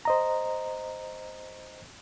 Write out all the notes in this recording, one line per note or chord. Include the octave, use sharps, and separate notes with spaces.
C5 D#5 A#5